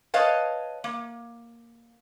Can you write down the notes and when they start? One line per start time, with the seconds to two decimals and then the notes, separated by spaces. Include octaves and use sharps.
0.14 B4 C#5 D#5 F5 A5
0.84 A#3